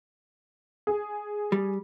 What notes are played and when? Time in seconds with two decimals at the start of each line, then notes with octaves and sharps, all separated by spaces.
0.87 G#4
1.52 G3